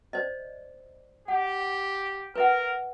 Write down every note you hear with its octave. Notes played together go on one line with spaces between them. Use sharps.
C5 D5 D#5
G4 F#5
A#4 B4 E5 F#5